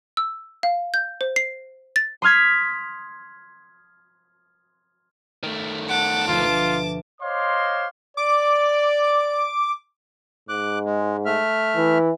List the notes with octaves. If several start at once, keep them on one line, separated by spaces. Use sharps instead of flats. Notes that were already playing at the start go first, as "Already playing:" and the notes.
E6
F5
G6
C5
C7
A6
C6 D#6 F6 G#6 B6
D#3 A3
F#5 A5 D6
D2 B2 F3 F4
C5 C#5 D#5 F5 C6 D6
D5 D6
G#2 D6 F#6
G#3
A3 E5 F6
E3